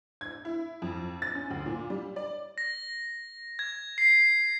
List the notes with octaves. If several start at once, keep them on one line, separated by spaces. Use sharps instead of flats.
G#6
E4
F2
A6
C#4
D2
A#2
G3
D5
A#6
G#6
C7